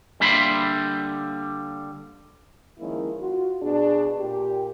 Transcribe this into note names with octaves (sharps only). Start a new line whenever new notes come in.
D3 G3 A#3 E5 B5 C6
D#3 F3 G#3 A#3 C#4 E4
F4 F#4
B2 D4 G#4
A#2 G4